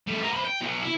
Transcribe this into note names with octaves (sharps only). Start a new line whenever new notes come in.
G3 A3
B3 A#4
C5 B5
G5
B1 B2
E4